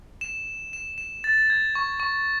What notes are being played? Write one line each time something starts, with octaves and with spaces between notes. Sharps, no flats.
E7
E7
E7
A6
G#6
C#6
C#6